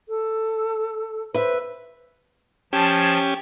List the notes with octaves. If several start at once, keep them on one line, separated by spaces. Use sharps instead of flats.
A4
B4 C5 E5
F3 C#4 G4 A5 G#6